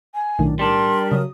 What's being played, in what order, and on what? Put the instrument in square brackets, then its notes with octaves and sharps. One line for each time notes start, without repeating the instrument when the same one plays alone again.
[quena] G#5
[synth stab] B1 A2 D#3 [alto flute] D4
[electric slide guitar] G3 D4 [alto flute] A#4 [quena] C6
[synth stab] C#3 F#3 [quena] D#6